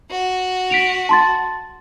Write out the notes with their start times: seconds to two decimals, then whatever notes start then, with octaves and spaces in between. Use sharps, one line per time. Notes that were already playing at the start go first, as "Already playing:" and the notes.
0.10 F#4
0.70 B6 D7 F7
1.09 A5 C6 A6